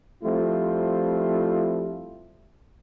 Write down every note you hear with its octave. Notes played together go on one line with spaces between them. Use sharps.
F3 G3 A3 C4 E4 F4